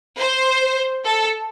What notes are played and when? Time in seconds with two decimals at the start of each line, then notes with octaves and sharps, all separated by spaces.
0.19 C5
1.05 A4